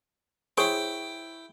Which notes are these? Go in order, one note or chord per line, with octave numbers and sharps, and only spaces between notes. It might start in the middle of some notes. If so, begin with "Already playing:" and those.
E4 G#4 C5 C#5 G5